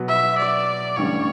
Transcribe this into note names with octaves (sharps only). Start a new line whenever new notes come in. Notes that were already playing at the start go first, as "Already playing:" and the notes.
Already playing: B2 F#3 B3 F#4
E5
D5
A1 G2 D3 G3 C#4 C#5